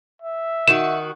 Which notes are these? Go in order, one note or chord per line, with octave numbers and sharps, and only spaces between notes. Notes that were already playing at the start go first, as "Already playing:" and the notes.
E5
D#3 F#4 E7